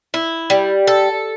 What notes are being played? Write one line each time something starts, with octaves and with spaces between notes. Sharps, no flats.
E4
G3
A4